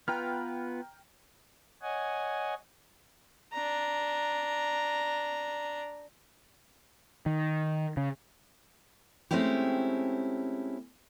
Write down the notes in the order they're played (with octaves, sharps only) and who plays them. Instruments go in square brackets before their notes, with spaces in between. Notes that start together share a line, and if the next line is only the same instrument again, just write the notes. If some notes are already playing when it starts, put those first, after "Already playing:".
[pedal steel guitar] B3 F4 B4 [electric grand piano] G5 A#5 F6
[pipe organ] C#5 D#5 F#5 G#5
[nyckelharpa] D4 A#5
[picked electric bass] D#3
C#3
[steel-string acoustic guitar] G#3 A3 C4 C#4 E4 G4